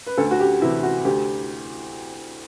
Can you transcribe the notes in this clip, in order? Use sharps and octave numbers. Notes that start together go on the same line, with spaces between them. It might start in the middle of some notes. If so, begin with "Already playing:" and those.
B4
D2 A4
F#4
G4
C3 E3 E4
F#4
D2 G4